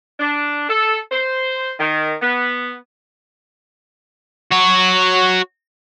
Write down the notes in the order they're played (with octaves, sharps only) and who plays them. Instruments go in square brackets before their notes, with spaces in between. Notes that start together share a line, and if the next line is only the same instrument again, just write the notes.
[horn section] D4
A4
C5
D#3
B3
[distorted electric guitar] F#4 C#5